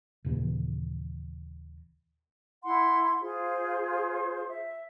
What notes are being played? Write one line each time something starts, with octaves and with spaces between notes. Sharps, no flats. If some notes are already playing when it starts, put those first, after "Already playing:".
D#1 A#2 C#3 E3
E4 F#5 C6
F4 G#4 C5
E5